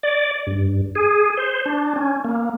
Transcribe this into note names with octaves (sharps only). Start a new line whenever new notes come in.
D5
G2
G#4
C5
D4
C#4
A#3